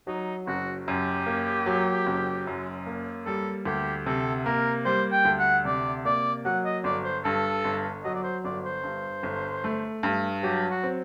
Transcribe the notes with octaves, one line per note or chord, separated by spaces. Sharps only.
F#3 D#4
F#1 F#4
F#2 G4
A#3
F#3
F#1
F#2
A#3
G3 A4
D2 G4
C3 A4
A#3 A#4
G3 C5
G5
D2
F#5
C3 D5
A#3 D5
F#3 F#5
D#5
G1 D5
C5
G2 A4
G1
F#3 D#5
D5
C5
G1 D5
C5
G2
G1
A3
G2
F#3 G4
F#4
C4